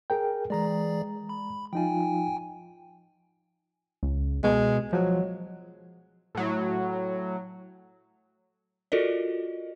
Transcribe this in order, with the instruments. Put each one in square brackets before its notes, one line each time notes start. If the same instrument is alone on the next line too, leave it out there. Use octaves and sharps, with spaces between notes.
[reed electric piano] G#4 A#4 G5
[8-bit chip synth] E3 G#4 D5 [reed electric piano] G#3 A#5
[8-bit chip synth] B5
[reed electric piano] F3 D#4 F4 [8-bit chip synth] G5 G#5
[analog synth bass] C#2
[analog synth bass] B2 [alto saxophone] G#3
[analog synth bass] F3 [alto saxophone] F#3
[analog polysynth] A2 F#3
[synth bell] F4 F#4 A4 A#4 D5 D#5